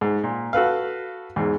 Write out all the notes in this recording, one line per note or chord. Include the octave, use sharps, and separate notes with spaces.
G#2
A#2
F#4 A4 B4 F5
E2 G#2